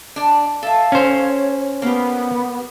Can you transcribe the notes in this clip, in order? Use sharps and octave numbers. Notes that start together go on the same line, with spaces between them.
D4 D5
A4 E5 F5
C#4 C5
C#5
A#3 B3 G4